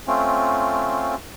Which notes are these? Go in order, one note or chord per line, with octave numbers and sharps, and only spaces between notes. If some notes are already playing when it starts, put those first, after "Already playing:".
A3 C4 C#4 F4